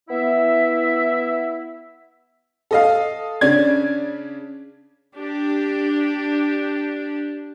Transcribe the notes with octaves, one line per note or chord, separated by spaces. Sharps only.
B3 E4 E5
A4 D#5 F5
C#3 C#4 D4 D5 G#6
D4 G4